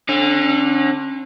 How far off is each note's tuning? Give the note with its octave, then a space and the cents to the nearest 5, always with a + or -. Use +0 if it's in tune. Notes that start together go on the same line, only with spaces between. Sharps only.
D3 +0 C#4 -40